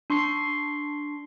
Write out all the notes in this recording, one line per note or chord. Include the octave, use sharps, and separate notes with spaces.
D4 C6 C#6 C7